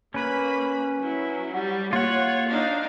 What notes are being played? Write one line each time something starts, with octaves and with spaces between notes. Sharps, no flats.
A#3 C#4 B4 B5
F#3 E4
G3 F#5
A#3 F4 C#5 F#5
D4 D#4 F5